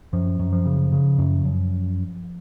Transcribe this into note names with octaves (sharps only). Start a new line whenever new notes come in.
F#2 F3
F#2
F3
C#3
C#3
F#2
F#2